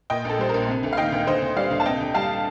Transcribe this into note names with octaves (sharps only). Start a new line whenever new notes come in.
A#2 D#5 G5
A#1 A4
G3 C5
A#4
A#1
C3
D2
F5
D#3 D#5 G5
D2
D3 C5 D#5
D2
G3 D5 F5
D2
A5
C3 D#5 G5
D2
G3 F5 A5